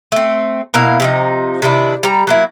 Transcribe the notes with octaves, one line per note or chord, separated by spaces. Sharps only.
A3 C4
B2 A#3 E4 F5
C3 F3 D#4
C3 D#3 D4 E4
G3 A#5
F#3 A#3 E4